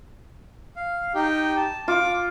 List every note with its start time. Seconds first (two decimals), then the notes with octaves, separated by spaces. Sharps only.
0.76 F5
1.15 D#4 G4
1.56 A5
1.88 F4 D6